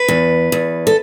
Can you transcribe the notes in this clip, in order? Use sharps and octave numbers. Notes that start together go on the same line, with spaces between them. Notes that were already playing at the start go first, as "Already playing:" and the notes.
Already playing: B4
E2
E2
A4